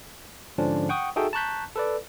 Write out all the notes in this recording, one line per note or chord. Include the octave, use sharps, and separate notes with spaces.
G#2 D3 F3 C#4 D4
F#5 G5 C#6 D#6
D#4 F#4 G#4 A4 E5 G5
A5 A#5 C#6 F#6 G6 B6
A4 B4 D5